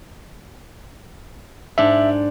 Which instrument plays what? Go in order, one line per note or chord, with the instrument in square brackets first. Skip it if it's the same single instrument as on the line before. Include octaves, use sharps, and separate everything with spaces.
[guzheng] G#2 D4 [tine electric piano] E5